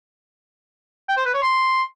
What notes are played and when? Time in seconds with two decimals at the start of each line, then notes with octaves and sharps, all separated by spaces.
1.09 G5
1.17 C5
1.25 B4
1.34 C#5
1.42 C6